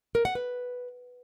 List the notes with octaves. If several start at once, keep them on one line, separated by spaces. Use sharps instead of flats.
A#4
F#5
B4